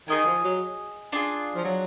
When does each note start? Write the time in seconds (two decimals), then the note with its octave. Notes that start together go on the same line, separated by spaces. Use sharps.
0.08 D#3 G#4 D#5 G#5
0.25 F3
0.43 F#3
1.12 D4 F4 G#4
1.55 F3
1.64 F#3